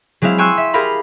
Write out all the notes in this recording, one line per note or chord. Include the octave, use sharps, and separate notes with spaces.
F#3 G#3 C4 E4 F5
G5 G#5 C6 C#6 E6 F#6
E5
G4 G#4 A#4 F5 B5